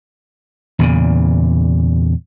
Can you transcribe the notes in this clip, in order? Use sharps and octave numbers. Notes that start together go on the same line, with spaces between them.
E2 A#2 C#3